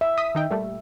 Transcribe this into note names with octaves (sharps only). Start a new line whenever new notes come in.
E5
D#6 B6
D#3 D#4 G5
A#2 G3 A3